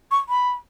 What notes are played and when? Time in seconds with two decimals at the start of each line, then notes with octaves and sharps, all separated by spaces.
0.11 C#6
0.29 B5